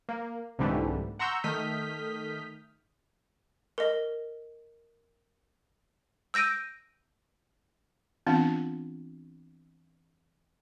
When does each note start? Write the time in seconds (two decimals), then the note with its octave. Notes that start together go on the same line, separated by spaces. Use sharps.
0.09 A#3
0.59 C2 G#2 D3 E3 G3 A3
1.19 F#5 A#5 C6 C#6 E6 G6
1.44 D#3 A3 D#6 F6 G6 B6
3.78 A#4 D#5
6.34 E6 G6 A#6 D7 D#7
8.27 E3 B3 C4 D4 F4